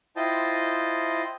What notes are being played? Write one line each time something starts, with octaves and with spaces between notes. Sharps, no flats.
E4 F4 C5 D#5 G5 A5